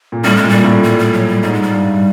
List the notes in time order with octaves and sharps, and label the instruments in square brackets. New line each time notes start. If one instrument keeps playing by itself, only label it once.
[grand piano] A#2
[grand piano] A2 [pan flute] G3
[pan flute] G#3
[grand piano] A#2
[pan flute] G3
[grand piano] A2
[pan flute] G3
G3
F#3
G3
[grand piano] G#2 [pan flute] G3
[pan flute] G#3
G3
[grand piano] G2